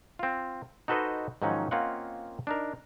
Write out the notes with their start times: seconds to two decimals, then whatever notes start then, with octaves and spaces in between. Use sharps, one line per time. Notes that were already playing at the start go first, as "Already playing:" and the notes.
0.19 C4 F4
0.88 D#4 F#4 A4 B4 C5 D#5
1.42 G#2 D#3 F3 F#3 C#4 D#4
1.71 A#3 C4 C#4 F4 D#5 F#5
2.47 D4 D#4 A#4